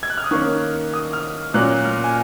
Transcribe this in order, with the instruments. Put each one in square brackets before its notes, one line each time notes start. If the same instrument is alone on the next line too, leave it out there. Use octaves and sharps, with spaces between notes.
[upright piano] G#6
F#6
F6
D#6
D#3 A#3 C#4 C#6
D#6
F6
A#2 F#3 A#3 C#4 F#6
F6
G#5